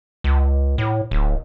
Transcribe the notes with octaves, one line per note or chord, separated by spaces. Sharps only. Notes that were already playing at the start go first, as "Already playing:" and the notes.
C#2
A2
D1